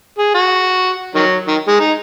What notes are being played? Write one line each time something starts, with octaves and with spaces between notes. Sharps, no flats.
G#4
F#4
D#3 F#3
D#3
G#3
D#4